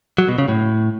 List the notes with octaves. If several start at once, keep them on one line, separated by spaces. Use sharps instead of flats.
F#3
B2
C#3
A2